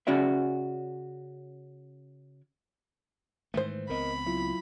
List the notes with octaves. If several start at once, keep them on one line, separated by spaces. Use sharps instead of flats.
C#3 C#4 F#4 D5 E5
G#2 D#3 E3 A3 C5
C#2 B3 C4 A#4 D#5 B5
F#3 E4 F4